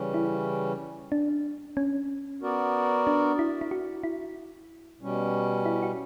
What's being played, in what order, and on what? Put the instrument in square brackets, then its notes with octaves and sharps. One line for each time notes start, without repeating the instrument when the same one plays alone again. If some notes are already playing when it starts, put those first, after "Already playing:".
Already playing: [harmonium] C#3 E3 G3 C#4
[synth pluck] E4
D4
C#4
[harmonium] B3 F#4 A#4 D5
[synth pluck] D4
E4
E4
F#4
E4
[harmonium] B2 G3 C#4
[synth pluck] E4
F#4